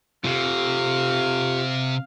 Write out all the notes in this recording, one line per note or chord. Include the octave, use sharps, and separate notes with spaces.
C3 F4 G4 F5